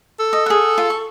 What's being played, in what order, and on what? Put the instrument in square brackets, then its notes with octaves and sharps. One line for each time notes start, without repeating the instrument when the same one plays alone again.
[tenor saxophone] A4
[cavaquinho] D#5
G#4 F#5
F4
C#6